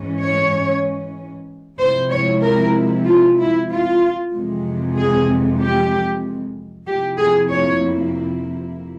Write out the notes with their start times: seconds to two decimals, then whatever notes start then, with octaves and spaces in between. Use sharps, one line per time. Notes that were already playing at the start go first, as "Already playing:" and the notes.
Already playing: G#2 E3 G#3 C#4
0.20 C#5
1.78 C3 F3 G#3 E4 C5
2.10 C#5
2.42 A#4
3.06 F4
3.37 E4
3.69 F4
4.33 F2 C3 E3 G#3
4.96 G#4
5.60 G4
6.87 F2 C3 F3 A#3 E4 G4
7.18 G#4
7.50 C#5